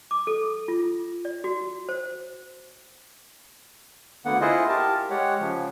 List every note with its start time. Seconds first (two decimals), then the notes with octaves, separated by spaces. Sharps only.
0.11 D6
0.27 A4
0.68 F4
1.25 D5
1.44 F#4
1.89 C5
4.25 D2 D3 A#3 B3 F#5
4.41 E4 F4 G#4 C5 D#5
4.69 G4 A#4 A5
5.10 G#3 G4 C#5 F#5
5.40 C#3 F3